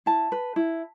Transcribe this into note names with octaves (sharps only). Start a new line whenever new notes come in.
E4 A5
B4
E4